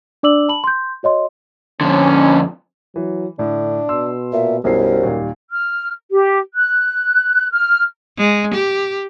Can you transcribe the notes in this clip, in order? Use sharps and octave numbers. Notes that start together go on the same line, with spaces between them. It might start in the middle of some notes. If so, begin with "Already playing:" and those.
D4 D5 D6 E6 F#7
A5 B5 F#7
C6 G6
F#4 C#5 D#5 C6
F2 D3 C#4
E3 F#3
A2 D3 D4
B2 C6 E6
A#2 E5
B1 F#2 G3 E4 C5 C7
D#2 A#2 D#3
F6
G4
F#6
F6
G#3
G4